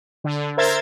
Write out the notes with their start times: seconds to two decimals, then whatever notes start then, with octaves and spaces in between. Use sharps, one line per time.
0.24 D3
0.57 A#4 C5 E5 G#6 A6